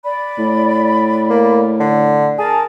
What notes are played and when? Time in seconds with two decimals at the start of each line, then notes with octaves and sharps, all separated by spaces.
0.04 D5 B5
0.38 A2
1.29 A#3
1.80 D3
2.39 G#4 A#4 A5